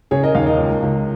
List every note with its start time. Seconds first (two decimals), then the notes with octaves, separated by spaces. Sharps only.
0.11 C#3 G#4 C#5
0.23 A#4 D#5
0.35 D#2 C#5 F5
0.46 A#4 D#5
0.58 C#2
0.82 C#2